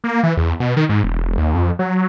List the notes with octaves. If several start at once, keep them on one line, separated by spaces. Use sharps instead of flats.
A#3
E3
E2
B2
D#3
G#2
E1
D#2
F2
F#3